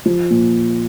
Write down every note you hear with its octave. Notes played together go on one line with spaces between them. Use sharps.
F3
A#2